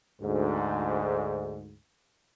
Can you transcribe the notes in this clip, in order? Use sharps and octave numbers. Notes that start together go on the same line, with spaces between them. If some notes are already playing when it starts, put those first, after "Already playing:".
D2 G#2